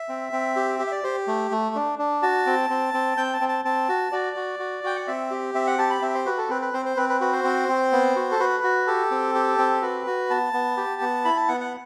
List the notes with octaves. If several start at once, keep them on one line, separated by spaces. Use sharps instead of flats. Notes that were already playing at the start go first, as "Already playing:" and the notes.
Already playing: E5
C4
C4
G4
G4
E5
D5
G4 C5
A3
A3
D4
D4
F#4 A5
C4
C4
C4
C4 G5
A5
C4
A5
C4 A5
F#4
F#4 D5
F#4
F#4
F#4 G5
F#5
C4 E5
G4
C4 E5
F#5
G4 A5
B5
C4 E5
C5
F#4 B4
A4
C4 B4
B4
C4 C5
C5
C4 B4
B4
F#4 B4
C5
C4
C4
B3
F#4
A4
F#4 B4
F#4
G4 A4
C4
G4
C4
F#4 B4
F#4
B3 A5
B3
G4
B3
E4 B5
A5
B3 F#5
F#5